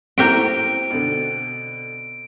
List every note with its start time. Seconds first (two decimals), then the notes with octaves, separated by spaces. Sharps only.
0.18 A3 A#3 C4 E4 F#4 G4 A#4 D7
0.90 B2 D3